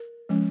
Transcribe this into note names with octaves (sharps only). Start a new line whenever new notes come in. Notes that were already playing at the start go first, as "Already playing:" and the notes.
Already playing: A#4
F3 G#3 C#4